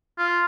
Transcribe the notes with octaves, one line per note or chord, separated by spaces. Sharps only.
F4